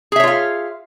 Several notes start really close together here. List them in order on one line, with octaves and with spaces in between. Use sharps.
G#4 E5 C#5 F4 F5